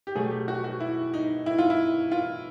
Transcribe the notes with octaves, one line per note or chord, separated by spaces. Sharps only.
G4
B2 F#3 A3 G#4
G4
F#4
F#4
E4
D#4
E4
F4
E4
F4